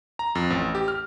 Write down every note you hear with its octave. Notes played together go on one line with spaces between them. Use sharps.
A#5
F2
A1
G4
F6